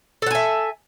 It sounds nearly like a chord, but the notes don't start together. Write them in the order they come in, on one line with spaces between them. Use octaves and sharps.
A4 F#5 G#5 E5